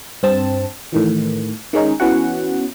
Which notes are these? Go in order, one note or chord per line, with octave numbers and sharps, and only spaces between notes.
G2 C4 A5
A2 D#3 E3
D#3 G#3 C#4 D#4
E3 B3 C#4 F#4 F#5